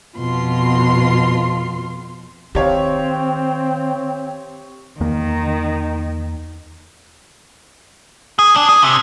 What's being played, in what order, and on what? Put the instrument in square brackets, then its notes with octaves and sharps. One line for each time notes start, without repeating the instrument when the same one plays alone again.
[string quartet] F2 B2 F4 C6
[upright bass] D#3 [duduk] C4 [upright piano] G4 C#5 F5
[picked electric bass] E2 A#3 [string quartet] D#3
[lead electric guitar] G#4
D4
G#4
C3